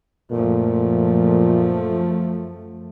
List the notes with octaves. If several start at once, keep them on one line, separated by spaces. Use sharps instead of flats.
F#2 A#2 F3 A3